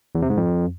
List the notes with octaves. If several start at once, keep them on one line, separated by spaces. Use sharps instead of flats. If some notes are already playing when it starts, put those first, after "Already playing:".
E2
C3
G#2
F2